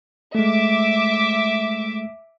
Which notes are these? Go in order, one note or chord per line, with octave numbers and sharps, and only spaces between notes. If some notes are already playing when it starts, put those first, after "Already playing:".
G#3 A3 E5 D6